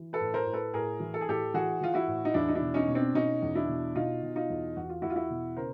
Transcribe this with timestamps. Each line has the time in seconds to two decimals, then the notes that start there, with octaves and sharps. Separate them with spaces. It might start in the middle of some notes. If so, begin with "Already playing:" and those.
Already playing: E3
0.13 A4 B4
0.21 A2
0.34 A#4 C5
0.46 A2
0.53 A4 B4
0.73 A2 G#4 A#4
1.00 E3
1.14 A4
1.21 G#4
1.28 A2 G4 A4
1.54 E3 F#4 G#4
1.81 E3 F4
1.94 E4 F#4
2.07 A2
2.25 D#4
2.34 E2 D4 E4
2.48 D#4
2.55 D4 E4
2.61 B2
2.74 C#4 D#4
2.88 B2
2.95 C4 D4
3.15 B2 C#4 D#4
3.42 E2
3.55 D4 E4
3.68 B2
3.95 B2 D#4 F4
4.23 B2
4.36 D#4 F4
4.50 E2
4.77 E2 F#4
4.89 F4
5.02 E2 E4 F#4
5.10 F4
5.16 E4 F#4
5.30 B2
5.57 C#3 A#4 C5